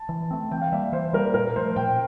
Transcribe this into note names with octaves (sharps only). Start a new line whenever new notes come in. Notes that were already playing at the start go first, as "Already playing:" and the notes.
Already playing: A5
E3
A3 C4
E3 G5
F5
G3 A#3 E5
E3 C5
G3 A#3 A#4
A#2 A#4
F3 A3 C5
A#2 G5